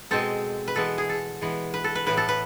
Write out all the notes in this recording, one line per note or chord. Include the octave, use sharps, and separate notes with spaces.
B2 G#3 C4 A4
B4
E3 G#3 B3 A4
G#4
A4
E3 G#3 B3
B4
A4
B4
A2 E3 B3 B4
A4
B4